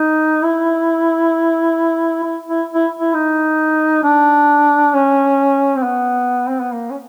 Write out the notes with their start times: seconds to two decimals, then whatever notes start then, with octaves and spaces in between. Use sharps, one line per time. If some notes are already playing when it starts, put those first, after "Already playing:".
Already playing: D#4
0.44 E4
2.24 E4
2.49 E4
2.74 E4
2.99 E4
3.14 D#4
4.03 D4
4.94 C#4
5.76 C4
5.83 B3
6.49 C4
6.61 B3
6.73 A#3
6.90 C#4